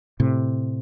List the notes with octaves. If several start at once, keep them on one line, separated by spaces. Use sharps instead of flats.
A2 C3